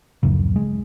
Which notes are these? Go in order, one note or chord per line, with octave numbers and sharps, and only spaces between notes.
D1 A#1 F#2 C#3
G#3